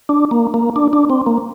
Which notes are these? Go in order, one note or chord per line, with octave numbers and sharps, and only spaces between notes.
D4
A#3
A#3
D4
D4
C4
A#3